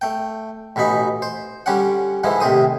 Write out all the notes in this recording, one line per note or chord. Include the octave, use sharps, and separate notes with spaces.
A3 G5
A1 B2 E3 D#4 B5
C5
D3 G3 C#4 G4 F#5
G#2 D3 E3 F3 E4
D#2 A2 C3 C5 D#6